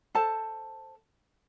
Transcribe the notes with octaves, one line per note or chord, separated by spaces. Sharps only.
A4 C5 A5